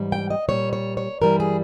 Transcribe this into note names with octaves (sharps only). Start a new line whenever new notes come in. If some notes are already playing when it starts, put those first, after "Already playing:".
Already playing: G#2 E3 G3
G5
D#5
A#2 G3 C#5
C#5
C#5
G2 E3 G3 A#4
G#4